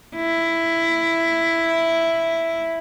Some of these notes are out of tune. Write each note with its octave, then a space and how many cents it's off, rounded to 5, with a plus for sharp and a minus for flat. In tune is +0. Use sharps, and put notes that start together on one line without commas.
E4 +5